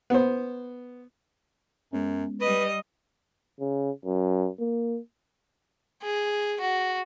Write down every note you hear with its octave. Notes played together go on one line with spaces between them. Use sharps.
B3 C5
F#2 G#3 B3 C#4
G3 B4 D#5
C#3
F#2
A#3
G#4
F#4